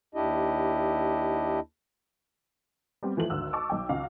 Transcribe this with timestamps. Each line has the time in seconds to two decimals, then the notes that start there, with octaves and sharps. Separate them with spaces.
0.15 D#2 D4 E4 G4 D#5
3.03 G3 B3 C4 G4
3.17 E3 F3 A3 F#7
3.30 G#1 D2 E6 F#6
3.53 A5 C#6 D6 E6
3.70 B1 G5
3.89 C#2 C#3 F#4 F5